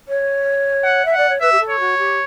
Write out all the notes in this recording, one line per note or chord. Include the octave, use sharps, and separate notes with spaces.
C#5
F#5
E5
D5 F#5
C#5
B4 E5
G4
A4
C#5
F#4
G4